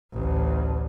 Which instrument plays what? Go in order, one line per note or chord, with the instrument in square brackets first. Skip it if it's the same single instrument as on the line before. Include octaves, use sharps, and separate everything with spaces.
[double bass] A1 D2